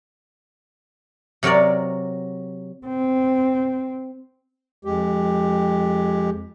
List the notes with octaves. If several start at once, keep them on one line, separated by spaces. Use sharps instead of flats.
C3 F#3 A#4 C#5 D5
C4
F2 G#3 G4